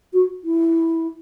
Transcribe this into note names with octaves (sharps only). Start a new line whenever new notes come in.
F#4
E4